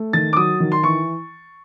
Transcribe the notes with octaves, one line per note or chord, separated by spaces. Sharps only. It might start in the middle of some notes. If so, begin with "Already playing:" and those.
Already playing: A3
D#3 A6
D6
F#3 D#6
D#3
C6
E3 C#6